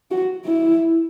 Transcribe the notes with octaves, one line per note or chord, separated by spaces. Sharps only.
F#4
E4